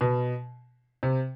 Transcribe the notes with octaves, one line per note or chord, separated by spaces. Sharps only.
B2
C3